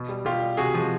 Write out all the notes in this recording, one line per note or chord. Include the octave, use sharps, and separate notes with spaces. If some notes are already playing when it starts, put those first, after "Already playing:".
Already playing: B2
G3
B2 F4 G4
G3
C3 F#4 G#4
F3 G#3